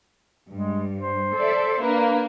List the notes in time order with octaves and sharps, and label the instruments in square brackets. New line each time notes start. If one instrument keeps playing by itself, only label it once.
[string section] G2 [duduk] G#3
[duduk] C5
[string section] A4 D5 E5
[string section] A#3 D4 [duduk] B4